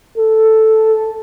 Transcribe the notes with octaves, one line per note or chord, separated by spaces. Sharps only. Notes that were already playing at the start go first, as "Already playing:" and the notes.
A4